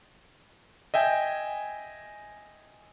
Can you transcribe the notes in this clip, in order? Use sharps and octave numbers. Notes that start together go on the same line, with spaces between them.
D#5 E5 G5 G#5